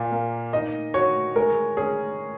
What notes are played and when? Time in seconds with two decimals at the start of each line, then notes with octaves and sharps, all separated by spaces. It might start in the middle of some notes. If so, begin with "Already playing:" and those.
Already playing: A#2
0.12 A#3
0.53 D#4 D#5
0.94 F#4 C#5
1.36 G#3 A#4
1.77 C#4 G#4